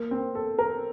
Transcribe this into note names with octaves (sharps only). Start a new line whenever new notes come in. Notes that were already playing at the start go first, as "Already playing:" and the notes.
Already playing: A#3
C4
A4
A#4